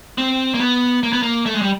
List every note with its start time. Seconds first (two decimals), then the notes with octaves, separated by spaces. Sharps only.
0.18 C4
0.54 A#3
0.60 B3
1.03 A#3
1.13 B3
1.22 A#3
1.46 A3
1.54 G#3
1.62 G3